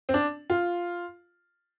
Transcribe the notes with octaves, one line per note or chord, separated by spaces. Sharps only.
C4
D4
F4